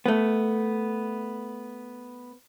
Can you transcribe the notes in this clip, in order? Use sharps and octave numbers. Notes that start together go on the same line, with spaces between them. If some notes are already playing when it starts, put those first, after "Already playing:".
A3 B3